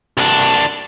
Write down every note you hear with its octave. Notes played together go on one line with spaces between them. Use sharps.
C2 D4